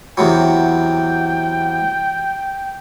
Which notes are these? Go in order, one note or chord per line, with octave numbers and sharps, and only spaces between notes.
E2 C3 F#3 G5